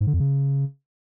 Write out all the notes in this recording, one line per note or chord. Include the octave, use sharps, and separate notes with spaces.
G#2
D3
F2
C#3